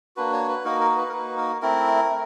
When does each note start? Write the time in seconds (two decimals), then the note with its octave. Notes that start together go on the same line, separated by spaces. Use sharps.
0.16 A#3 D4 F#4 B4
0.33 C#5
0.49 B4
0.64 A#3 D#4 F#4 A#4
0.81 A#4
0.91 A#4
0.97 B4
1.09 A#4
1.13 A#3 D#4 F#4 B4
1.37 A#4
1.62 A3 C4 E4 A#4
2.10 A3